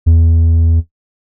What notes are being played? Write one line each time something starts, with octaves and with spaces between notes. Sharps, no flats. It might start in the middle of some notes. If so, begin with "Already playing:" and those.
E2